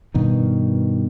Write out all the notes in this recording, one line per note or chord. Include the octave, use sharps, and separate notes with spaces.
G2 B2 D#3